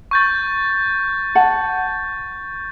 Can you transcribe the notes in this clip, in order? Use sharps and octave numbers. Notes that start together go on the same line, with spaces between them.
C#6 G6 A6
F#5 A5